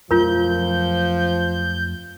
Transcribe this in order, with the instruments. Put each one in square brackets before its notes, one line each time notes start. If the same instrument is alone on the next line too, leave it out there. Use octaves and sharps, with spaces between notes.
[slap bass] F2 F#3 A3 [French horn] F3 [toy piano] F4 A#4 [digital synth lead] G6